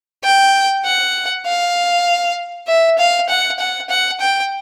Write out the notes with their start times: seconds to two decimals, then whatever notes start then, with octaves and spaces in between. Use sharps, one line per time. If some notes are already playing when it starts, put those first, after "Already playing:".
0.23 G5
0.85 F#5
1.46 F5
2.67 E5
2.98 F5
3.29 F#5
3.59 F#5
3.89 F#5
4.20 G5